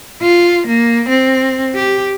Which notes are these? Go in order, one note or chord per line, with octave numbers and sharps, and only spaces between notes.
F4
A#3
C4
G4